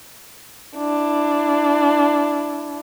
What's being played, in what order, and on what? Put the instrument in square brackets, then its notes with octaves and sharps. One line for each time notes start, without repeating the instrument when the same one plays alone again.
[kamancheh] D4 E4